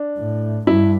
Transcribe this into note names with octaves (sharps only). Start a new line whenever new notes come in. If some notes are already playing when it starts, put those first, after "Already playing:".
Already playing: D4
A2
G2 E4